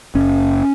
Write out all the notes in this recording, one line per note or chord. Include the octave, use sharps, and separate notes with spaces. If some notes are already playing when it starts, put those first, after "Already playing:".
F#1 C#4